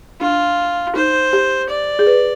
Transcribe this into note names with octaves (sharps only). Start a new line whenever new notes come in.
D4 F4
D#4 C5
G4
D5
G#4
B4